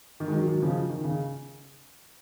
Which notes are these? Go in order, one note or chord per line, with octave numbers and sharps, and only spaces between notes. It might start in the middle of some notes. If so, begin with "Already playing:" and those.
D#3
G#3
D#3 F#3
D#3 F#3
C#3 F3
D#3
C#3